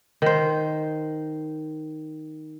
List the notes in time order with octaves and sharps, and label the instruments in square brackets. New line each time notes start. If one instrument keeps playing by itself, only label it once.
[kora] D#3 C5